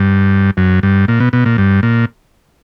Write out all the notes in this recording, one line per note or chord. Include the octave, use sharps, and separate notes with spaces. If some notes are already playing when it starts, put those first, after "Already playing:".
Already playing: G2
F#2
G2
A#2
B2
B2
A#2
G2
A#2